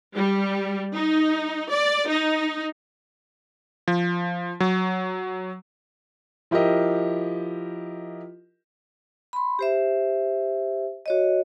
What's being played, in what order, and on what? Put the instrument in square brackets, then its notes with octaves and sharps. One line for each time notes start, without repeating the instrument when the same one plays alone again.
[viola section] G3
D#4
D5
D#4
[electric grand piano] F3
F#3
[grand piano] F3 E4 G4 A#4 D#5
[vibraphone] B5 C6
G4 C5 E5
F#4 C#5 D#5